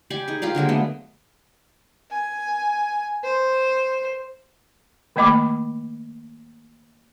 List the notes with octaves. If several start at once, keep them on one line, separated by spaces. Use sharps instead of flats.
G4 D5 G#5 B5
D#4 G#4
F4 G4 A#4 D5
D3 F#3 G#3 A#3
A3 B3 D#5
G#5
C5
D#3 A3 A#3 D#5 B5 D6